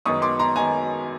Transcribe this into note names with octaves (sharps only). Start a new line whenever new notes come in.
F#2 D#3 G#3 B3 C#6 D#6
C6 D6
A#5 C6
D#3 G#3 B3 G#5 A#5